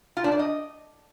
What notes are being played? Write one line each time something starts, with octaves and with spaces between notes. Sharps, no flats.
F4
D4
D5
D#5